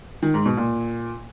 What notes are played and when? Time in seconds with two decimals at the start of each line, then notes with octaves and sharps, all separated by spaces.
0.22 D#3
0.34 G#2
0.46 B2
0.57 A#2